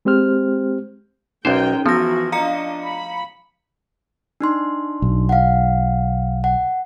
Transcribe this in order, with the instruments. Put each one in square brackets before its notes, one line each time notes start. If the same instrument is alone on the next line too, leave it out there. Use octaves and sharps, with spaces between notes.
[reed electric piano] G#3 C4 G4 C5 F6
[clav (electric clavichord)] B1 C5 [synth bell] C#4 D#4 [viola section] A#4 G5
[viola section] E3 E4 F#4 [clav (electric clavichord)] F3 [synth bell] B3 A#6
[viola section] D4 F4 D#5 [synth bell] F5 A#5 C#7
[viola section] B5
[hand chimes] D4 D#4 C6
[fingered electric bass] B1
[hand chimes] F5 F#5
F#5